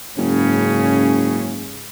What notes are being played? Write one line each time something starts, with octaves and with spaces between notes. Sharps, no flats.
F#1 G#2 C#3 C#4